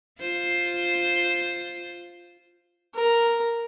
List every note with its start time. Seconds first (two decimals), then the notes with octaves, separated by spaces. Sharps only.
0.20 F4 C5
2.95 A#4